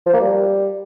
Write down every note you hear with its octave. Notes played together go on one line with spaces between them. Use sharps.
F3
A#3
G3